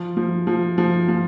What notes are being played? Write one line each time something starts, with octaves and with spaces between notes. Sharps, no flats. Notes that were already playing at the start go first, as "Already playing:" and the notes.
Already playing: F3
F3
F3
F3
F3